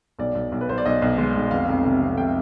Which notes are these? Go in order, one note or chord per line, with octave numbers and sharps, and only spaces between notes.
B1 D5
B1
B1
B4
B1 C5
D5
B1 D#5
B1
G#3
B1
F1 F5
F2
C3
F2
C3 G5